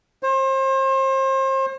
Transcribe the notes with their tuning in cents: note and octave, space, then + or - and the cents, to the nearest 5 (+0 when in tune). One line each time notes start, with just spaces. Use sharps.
C5 +35